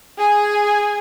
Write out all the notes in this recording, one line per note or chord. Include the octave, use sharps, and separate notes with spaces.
G#4 G#5